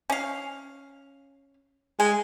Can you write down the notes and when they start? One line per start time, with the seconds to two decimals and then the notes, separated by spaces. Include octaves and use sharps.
0.10 C#4 F5
2.00 G#3 G#5